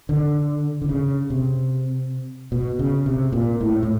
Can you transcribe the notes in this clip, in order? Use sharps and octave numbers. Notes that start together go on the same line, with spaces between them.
D3
D3
C#3
C3
B2
C#3
C3
A#2
A2
A2